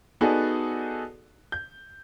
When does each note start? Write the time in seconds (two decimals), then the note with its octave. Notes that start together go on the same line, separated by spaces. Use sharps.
0.21 B3 D#4 F#4 G#4 A4 D5
1.52 G6